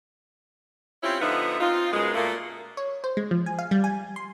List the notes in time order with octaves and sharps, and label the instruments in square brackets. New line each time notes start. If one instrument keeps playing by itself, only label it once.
[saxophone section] C4 C#4 E4 F4 G4
D3 F3 B3 D#4 E5
C4 D#4 F4
F#2 B2 G#3
A#2 A3 A#3
[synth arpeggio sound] C#5
C5
G#3
F3
G#5
F5
G3
G#5
C6